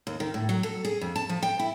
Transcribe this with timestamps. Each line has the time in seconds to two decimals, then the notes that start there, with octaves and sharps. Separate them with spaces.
0.07 D#2
0.20 D#3
0.34 A2
0.49 F#3
0.63 A4
0.85 G#4
1.01 F2
1.16 A5
1.29 F3
1.42 G5
1.60 E4